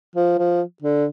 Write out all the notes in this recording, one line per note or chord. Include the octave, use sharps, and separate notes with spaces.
F3
F3
D3